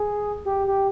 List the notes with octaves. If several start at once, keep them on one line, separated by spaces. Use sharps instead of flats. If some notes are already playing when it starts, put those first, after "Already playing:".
Already playing: G#4
G4
G4